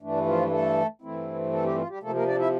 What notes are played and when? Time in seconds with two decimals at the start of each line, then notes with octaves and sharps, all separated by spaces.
0.01 G2 E3 A3 D4
0.26 F3 F4
0.51 A3 A4
1.02 G2 E3 A3 C4 E4
1.52 A4
1.64 G4
1.76 F4
1.89 G3 G4
2.03 C3 F3 A3 A#3 A4
2.15 A#3 A#4
2.28 D4 D5
2.39 E4 E5